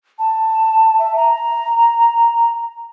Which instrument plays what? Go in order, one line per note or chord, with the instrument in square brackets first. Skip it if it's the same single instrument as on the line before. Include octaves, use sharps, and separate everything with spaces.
[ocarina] A5
E5
A#5